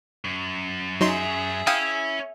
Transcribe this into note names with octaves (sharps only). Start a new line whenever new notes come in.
F#2
F#3 D#4 G#4 E5 C6
C#4 E4 F5 G5 D#6